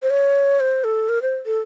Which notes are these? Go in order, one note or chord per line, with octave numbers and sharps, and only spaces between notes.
C5
C#5
C5
A4
A#4
C5
A4